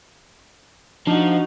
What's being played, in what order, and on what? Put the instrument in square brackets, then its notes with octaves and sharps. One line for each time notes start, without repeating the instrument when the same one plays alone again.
[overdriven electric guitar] F3 [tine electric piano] D4 [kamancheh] D#4 F#4